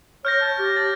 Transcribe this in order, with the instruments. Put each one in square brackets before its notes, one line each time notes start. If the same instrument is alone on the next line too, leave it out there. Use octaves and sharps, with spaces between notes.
[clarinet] C#5 [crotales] F6 G6 A#6
[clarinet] A5
G4
[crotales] A6